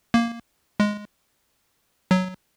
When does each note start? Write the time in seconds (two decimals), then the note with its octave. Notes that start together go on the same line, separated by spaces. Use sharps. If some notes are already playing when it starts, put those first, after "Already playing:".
0.14 A#3
0.80 G#3
2.11 F#3